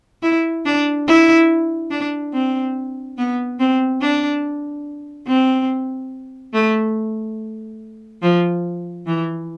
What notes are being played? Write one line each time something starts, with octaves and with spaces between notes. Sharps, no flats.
E4
D4
E4
D4
C4
B3
C4
D4
C4
A3
F3
E3